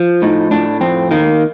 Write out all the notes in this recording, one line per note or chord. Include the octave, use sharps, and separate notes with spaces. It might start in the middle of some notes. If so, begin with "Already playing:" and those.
Already playing: F3
A2 D#4
A2 D4
F2 C4
D#3 A#3